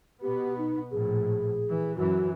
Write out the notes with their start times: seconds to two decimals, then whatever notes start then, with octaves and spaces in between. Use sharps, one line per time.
0.22 B2 B3 G4
0.58 D#4
0.91 A#1 A2 G#4
1.68 E3
1.97 F#2 E3 F#4